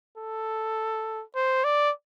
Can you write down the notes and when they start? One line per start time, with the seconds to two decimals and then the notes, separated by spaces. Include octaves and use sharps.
0.17 A4
1.35 C5
1.64 D5